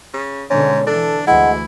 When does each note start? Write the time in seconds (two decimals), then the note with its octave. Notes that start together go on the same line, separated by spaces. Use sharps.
0.14 C#3
0.50 G#2 B2 D3 G#3 C#4
0.87 E3 D4 A4
1.27 D2 E3 G#3 E4 F#5